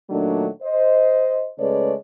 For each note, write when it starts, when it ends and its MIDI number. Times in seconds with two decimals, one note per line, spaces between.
0.10 0.47 46
0.10 0.47 51
0.10 0.47 54
0.10 0.47 57
0.10 0.47 62
0.63 1.49 72
0.63 1.49 75
1.59 1.93 49
1.59 1.93 56
1.59 1.93 57
1.59 1.93 71
1.59 1.93 73
1.59 1.93 74